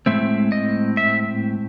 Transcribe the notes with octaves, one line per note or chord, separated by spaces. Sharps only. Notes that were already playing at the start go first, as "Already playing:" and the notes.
A2 G#3 C4 E5
D#5
E5